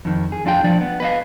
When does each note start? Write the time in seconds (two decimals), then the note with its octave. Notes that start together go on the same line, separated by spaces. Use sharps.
0.05 F2 D#3
0.32 G#4
0.45 F2 D4 F4 G4 G5
0.64 F3 D4 D5
0.81 B3
1.00 B4 D#5 F5